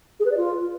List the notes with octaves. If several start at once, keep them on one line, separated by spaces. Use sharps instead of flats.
G#4
B4
D5
F4